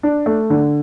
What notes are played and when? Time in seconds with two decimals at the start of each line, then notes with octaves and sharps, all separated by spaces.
0.03 D4
0.26 A3
0.50 D3